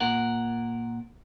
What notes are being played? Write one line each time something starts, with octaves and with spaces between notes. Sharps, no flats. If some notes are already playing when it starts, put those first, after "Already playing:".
A#2 A#4 F#5